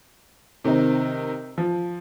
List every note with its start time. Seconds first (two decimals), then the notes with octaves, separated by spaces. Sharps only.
0.64 C3 D#3 C4 D#4
1.58 F3